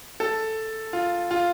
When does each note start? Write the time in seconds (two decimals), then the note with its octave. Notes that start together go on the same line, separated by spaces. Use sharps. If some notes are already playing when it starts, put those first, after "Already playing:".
0.20 A4
0.93 F4
1.31 F4